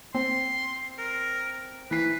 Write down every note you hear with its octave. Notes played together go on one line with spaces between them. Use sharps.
C4 C6
A#4
E3 B4 C7